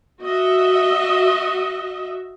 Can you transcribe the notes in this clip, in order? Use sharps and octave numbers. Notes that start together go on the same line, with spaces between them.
F#4 D#5 E5